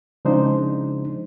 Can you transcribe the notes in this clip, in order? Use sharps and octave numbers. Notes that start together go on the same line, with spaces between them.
C#3 F3 G#3 D4 D#4 C5